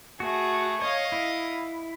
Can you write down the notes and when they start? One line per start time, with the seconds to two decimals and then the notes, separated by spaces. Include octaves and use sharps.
0.20 A3 F#4 G#4
0.81 C#5 D#5 F5
1.12 E4